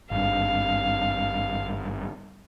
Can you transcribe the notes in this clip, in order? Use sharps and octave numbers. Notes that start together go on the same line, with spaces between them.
G#1 G2 F5